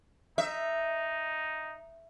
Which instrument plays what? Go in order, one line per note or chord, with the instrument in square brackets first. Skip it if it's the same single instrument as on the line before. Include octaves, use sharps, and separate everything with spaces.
[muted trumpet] D#4 [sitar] E5